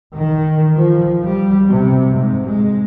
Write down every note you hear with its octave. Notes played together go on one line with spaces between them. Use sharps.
D#3
F3
G3
C3
G#2
G#3